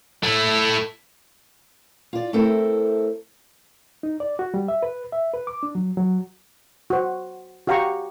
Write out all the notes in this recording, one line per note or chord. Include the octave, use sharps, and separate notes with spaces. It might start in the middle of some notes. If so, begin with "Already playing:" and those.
A3 E4
F4 D5
A3 C4 E4 A4 A#4 C5
D#4
D5
F#4
G3
E5
B4
E5
B4
D6
D4
F#3
F#3
F#4 C5
F#4 G4 F5 G5 A#5 C#6